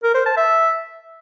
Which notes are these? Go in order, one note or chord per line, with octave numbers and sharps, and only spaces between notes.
A#4
C5
A5
E5